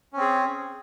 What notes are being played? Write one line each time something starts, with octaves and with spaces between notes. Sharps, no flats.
C4 C#4 G#4